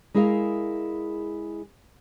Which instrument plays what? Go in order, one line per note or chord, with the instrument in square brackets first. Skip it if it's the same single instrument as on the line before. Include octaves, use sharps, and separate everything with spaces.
[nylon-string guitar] G#3 E4 G#4 A#4 F5